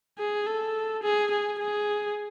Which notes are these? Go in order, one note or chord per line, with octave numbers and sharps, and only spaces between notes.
G#4
A4
G#4
G#4
G#4